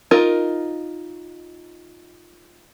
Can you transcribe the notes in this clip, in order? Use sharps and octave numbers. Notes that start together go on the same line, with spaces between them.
D#4 F4 A#4